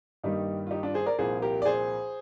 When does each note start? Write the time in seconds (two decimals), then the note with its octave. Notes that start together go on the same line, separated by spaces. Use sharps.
0.24 G2 D#3 G3 A#3 D#4 G4
0.67 F4
0.71 D#4 G4
0.83 D4 F4
0.94 G#4 C5
1.06 A#4 D5
1.18 C2 A#2 F3 A#3 G#4 C5
1.42 G4 A#4
1.62 D5
1.66 G#4 C5